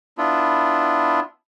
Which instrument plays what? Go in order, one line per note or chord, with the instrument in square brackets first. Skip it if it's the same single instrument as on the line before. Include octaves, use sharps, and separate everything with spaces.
[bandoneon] B3 D4 E4 F4